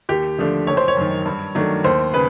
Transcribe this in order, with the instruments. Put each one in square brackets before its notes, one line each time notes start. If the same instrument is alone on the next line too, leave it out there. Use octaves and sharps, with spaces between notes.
[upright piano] D#2 [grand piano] G4
[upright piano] D3 F3 A3 D4
[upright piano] F#1 [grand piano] C#5
[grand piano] C5
C#5
[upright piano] F#2 D#3
G2
D#3 F#3 A3 D4
[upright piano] D#2 [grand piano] C5
[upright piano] C#3 [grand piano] B4